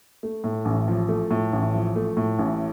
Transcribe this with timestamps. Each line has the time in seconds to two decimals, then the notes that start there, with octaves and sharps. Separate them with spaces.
0.23 A3
0.44 A2
0.65 A1
0.88 F3
1.09 A3
1.31 A2
1.53 A1
1.74 F3
1.96 A3
2.17 A2
2.39 A1